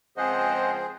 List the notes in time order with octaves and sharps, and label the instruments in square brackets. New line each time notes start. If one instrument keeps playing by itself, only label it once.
[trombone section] C#2 F3 C4 [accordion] G#4 C5 [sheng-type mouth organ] D#5 F#5